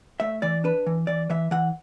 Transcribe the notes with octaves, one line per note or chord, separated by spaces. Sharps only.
A3 E5
E3 D5
D4 B4
E3
E3 D5
E3 E5
E3 F#5